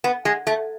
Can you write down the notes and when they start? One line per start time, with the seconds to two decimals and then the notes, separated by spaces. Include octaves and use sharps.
0.04 B3
0.25 G#3
0.47 A3